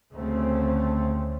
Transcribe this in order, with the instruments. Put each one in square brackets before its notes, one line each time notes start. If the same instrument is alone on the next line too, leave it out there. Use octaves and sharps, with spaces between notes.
[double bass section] D2 C#3 A3 C4